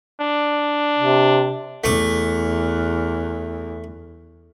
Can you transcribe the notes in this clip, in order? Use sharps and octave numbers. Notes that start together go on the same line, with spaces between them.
D4
C3
E2 A3 D6